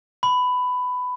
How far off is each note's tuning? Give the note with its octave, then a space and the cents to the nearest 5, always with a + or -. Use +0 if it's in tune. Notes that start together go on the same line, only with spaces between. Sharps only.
B5 +15